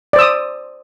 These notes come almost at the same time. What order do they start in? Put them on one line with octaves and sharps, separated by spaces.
D5 C5 E6 D#6